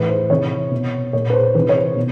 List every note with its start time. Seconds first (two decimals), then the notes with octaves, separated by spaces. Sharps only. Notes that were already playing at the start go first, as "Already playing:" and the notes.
Already playing: A2 E3 B4
0.09 C5
0.30 C3 E3 C#5
0.71 B2
1.13 A#2 C#5
1.30 B4
1.34 C5
1.55 C3 E3 B4
1.69 C#5
1.76 C5
1.96 B2